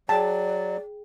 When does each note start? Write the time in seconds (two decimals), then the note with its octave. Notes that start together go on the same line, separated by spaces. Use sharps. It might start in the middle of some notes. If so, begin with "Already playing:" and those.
0.09 F#3 G#4 D5 G5 A5